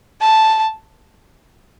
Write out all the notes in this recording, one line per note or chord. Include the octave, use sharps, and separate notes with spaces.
A5